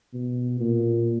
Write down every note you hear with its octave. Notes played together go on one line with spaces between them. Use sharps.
B2
A#2